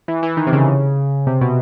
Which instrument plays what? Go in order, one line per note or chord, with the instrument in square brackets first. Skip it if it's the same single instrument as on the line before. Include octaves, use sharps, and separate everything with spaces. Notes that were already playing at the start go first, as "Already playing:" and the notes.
[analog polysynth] E3
E3
D#3
C3
C#3
C3
B2